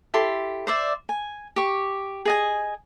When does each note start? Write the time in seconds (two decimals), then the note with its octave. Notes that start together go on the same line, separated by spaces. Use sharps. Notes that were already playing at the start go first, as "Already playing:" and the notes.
0.14 E4 G4 A4 C6
0.67 C5 D5 E5
1.09 G#5
1.56 G4 C#6
2.25 G#4 D#5 G#5